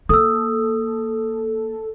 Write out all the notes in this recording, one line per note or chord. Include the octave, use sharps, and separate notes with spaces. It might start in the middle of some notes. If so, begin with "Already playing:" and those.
A#3 A4 D#6 E6